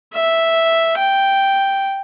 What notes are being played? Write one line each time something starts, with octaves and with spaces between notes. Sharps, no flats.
E5
G5